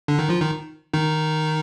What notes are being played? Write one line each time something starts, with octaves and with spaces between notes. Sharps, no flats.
D3 D4
D#3 D#4
F3 F4
D#3 D#4
D#3 D#4